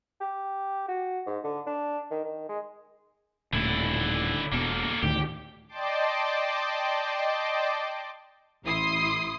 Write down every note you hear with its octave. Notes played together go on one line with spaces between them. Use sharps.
G4
F#4
G#2
D3
D4
D#3
D#3
G#3
D#1 A2 D3 E4
E1 B2 A#3 A4
D2 A2 D#3 G4
D5 D#5 G5 A5 C6 D6
A1 E4 C6 D#6 C7